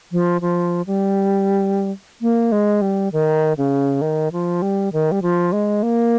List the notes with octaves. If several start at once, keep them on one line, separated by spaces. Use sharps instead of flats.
F3
F3
G3
A#3
G#3
G3
D#3
C#3
D#3
F3
G3
D#3
G3
F3
G#3
A#3